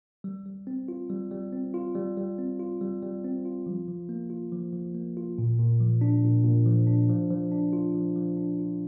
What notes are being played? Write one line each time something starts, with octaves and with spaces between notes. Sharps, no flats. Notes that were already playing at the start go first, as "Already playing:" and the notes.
G3
G3
C4
F4
G3
G3
C4
F4
G3
G3
C4
F4
G3
G3
C4
F4
F3
F3
A#3
F4
F3
F3
A#3
F4
A#2
A#2
F3
D4
A#2
A#2
F3
D4
F3
F3
D4
F4
F3
F3
D4
F4